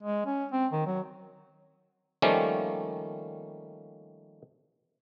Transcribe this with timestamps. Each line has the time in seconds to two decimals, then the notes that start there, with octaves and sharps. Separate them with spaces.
0.03 G#3
0.26 C#4
0.52 C4
0.72 D#3
0.87 F#3
2.22 D#3 F3 G3 A3 A#3 C#4